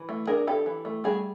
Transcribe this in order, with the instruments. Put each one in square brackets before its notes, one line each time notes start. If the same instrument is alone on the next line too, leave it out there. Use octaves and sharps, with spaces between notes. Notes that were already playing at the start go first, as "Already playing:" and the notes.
Already playing: [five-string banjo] E3
A3
D4 G#4 A#4
E3 G4 A4
E3
A3
G3 F#4 G#4